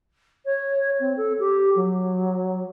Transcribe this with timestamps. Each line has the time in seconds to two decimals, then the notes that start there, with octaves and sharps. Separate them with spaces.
0.45 C#5
1.00 C4
1.17 A4
1.39 G4
1.76 F#3